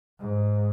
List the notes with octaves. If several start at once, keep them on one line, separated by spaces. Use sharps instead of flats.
G#2